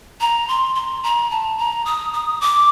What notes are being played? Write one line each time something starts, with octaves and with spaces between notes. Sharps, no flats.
A#5
C6
C6
A#5
A5
A#5
D#6
D#6
D6